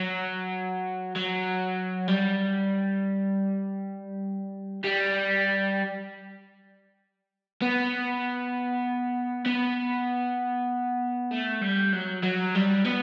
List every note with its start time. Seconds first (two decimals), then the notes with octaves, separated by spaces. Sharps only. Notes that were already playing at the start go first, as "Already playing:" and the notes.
Already playing: F#3
1.15 F#3
2.08 G3
4.84 G3
7.62 B3
9.46 B3
11.31 A3
11.61 G3
11.92 F#3
12.23 F#3
12.55 G3
12.84 B3